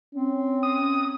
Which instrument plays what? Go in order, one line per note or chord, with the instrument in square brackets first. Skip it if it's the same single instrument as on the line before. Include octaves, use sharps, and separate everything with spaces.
[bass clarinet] C4 [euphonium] C#4
[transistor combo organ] D#6